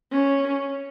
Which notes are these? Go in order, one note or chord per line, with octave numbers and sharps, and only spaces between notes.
C#4